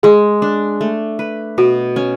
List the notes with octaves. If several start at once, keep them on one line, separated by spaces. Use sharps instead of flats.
G#3 G#4
D4
A3
B4
B2 F#4
C#4